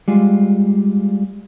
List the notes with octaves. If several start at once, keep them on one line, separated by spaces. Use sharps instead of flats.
G3 G#3 F4